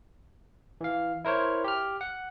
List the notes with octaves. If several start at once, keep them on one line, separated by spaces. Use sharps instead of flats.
E3 F5
E4 A#4 C5 C#5
G4 F6
F#5